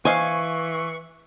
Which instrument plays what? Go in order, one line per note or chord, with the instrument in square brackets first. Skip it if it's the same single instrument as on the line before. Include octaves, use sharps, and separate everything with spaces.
[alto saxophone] E3 [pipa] C5 D#5 F5 [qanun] G#5 [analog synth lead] C#6